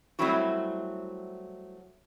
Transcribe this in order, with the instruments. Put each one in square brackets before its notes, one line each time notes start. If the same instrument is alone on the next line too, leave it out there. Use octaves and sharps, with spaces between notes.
[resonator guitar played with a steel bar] F#3 G3 A3 C4 E4 F#4